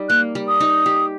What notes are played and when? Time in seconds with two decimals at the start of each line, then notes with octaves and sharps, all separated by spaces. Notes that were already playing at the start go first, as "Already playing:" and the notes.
Already playing: G3 D#4
0.09 A#3 F#6
0.35 G3
0.48 D#6
0.60 D#4
0.86 G4